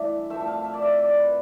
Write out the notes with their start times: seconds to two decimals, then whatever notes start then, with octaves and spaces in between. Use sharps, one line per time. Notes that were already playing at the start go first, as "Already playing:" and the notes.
Already playing: G2 E3 A3 D5 E5
0.30 C3 F3 A3 C4 E5
0.41 E5
0.48 F5
0.64 E5
0.74 D5
0.82 E5
0.99 D5
1.16 B4